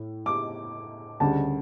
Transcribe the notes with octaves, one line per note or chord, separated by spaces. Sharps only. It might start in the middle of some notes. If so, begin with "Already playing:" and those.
Already playing: A2
D6
D2 C#3 G3 A5